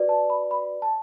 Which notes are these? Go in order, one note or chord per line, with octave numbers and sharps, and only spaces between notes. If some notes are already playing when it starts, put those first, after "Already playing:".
Already playing: F#4 B4 D5
A5
B5
B5
A5